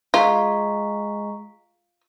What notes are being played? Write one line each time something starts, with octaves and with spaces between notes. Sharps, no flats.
G#3 F4 A#5 C#6 B6